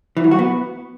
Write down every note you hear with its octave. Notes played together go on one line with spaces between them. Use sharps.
E3
F#3
F#4
B3